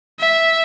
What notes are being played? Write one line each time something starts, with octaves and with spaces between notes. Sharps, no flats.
E5